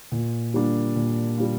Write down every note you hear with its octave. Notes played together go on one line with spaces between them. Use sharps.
A#2
G3 A#3 D4 F4
A#2
G3 A#3 D4 F4